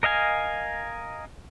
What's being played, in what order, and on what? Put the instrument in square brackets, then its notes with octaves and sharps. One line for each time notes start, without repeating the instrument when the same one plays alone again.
[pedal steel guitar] A#4 D#5 F5 G#5